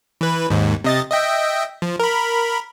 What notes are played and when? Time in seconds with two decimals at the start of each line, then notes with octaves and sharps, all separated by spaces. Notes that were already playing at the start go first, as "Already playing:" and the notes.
0.21 E3 B4
0.50 D#2 G#2
0.84 C3 D#5 A6
1.11 D#5 E5 G5
1.82 F3
2.00 A#4 B5